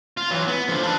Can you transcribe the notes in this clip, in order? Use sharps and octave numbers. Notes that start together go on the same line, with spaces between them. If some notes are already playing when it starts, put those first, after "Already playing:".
F4
E3 F#3
B3
D3 F3
D4 B4